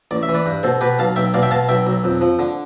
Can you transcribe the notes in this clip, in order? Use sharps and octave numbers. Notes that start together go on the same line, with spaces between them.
A1 D5
E5
E3
B4 D5
G2
B2 A4 C5
B2 G4 B4
B1 F5 A5
B1 E5 G5
B2 D5 F5
E5 G5
B2 F5 A5
B1 E5 G5
B1
F2
F3
D3